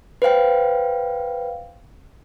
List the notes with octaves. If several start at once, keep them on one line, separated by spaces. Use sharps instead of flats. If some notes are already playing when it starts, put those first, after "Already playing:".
B4 C5 F5 G5